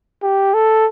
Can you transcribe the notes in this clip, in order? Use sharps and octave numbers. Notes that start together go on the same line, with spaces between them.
G4
A4